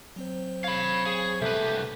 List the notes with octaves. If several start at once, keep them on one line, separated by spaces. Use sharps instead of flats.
F#3 C4 C5
C#5 F5 B5
G#4
C2 A3 G4 B4